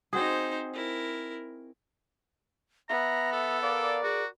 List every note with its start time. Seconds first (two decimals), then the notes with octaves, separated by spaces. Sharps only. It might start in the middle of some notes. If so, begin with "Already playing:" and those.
0.13 C4 D#4 F#4 G#4 C5
0.74 E4 A#4
2.89 B3 E5 A#5
3.32 A4
3.62 A#4 D5 F5
4.04 F#4 G#4